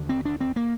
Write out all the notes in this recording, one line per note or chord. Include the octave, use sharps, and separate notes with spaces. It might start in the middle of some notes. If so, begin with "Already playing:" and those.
Already playing: D#2 D3
C4
D4
C4
A#3